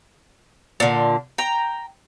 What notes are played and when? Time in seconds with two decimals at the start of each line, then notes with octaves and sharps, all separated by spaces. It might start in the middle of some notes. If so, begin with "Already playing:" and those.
0.80 A#2 D3
1.38 G5 A#5